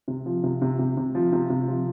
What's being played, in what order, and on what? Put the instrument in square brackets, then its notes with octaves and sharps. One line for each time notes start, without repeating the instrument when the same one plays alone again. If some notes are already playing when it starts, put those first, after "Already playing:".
[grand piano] C3
F3
C3
C3
C3
C3
F3
C3
C3
F3